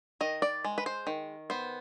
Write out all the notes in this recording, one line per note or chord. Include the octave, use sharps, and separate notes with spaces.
D#3 D#5
D5
G#3
B4
C5
D#3
B3 C5